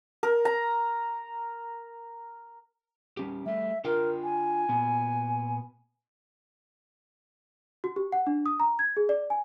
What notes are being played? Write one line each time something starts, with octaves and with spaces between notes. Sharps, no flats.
A#4
A#5
G3 C#4 G4
G3 A3 E5
D4 F4 A#4 G5
G#5
A#2 B3
F#4
G4
F#5
D4
D#6
A#5
G#6
G#4
D5
G#5